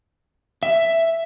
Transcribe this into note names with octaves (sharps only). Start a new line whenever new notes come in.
E5